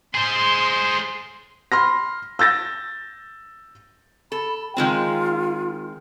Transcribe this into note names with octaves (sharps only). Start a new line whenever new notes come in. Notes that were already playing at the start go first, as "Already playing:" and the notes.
G#4 C5 C6
B5 C6 F6 A#6
E6 G6 A6 A#6
A4 B5
D#3 G#3 C4 F4